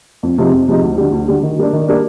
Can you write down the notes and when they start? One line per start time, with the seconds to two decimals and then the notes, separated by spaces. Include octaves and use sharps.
0.23 F2
0.38 C3 F3 G#3 D#4
0.53 F2
0.68 C3 F3 G#3 D#4
0.82 D2
0.97 D3 G3
1.12 D2
1.28 D3 G3
1.43 D#3
1.59 G3 A#3 D4
1.73 D#3
1.88 G3 A#3 D4